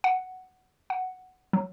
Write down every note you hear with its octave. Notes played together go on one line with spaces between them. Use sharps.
F#5
F#5
F#3